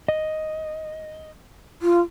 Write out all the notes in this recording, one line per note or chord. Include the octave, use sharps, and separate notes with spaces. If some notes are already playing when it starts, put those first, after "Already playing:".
D#5
F4